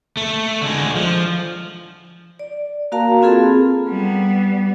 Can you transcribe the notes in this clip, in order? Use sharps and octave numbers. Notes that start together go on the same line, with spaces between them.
A3
D3 G#3
F3
D5
A#3 F#4 A#4 F5 A5 A#5
C4 F4 G#4 A4 B5
G3 B3